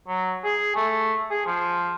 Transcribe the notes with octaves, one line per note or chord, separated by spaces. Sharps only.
F#3
G#4
A3
G#4
F3